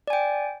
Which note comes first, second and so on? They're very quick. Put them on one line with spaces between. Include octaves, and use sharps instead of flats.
D5 G#5 G5